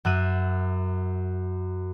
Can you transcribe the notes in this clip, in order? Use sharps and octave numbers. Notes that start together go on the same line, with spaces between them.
F#2 E5 F#6 D#7